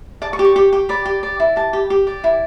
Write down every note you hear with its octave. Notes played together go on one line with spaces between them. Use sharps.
D5 A5
C#6
G4
C#6
G4 C#6
G4
D5 B5
G4
D5
E4
G4 A5
G4
G4
D5
E4